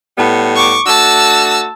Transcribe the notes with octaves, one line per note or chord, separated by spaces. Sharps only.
A2 G3 B3
C#6 D6
A3 D4 F#4 A5 E6